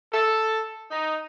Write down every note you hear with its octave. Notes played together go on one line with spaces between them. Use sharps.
A4
D#4